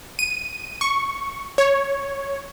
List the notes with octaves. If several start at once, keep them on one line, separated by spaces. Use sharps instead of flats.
D#7
C#6
C#5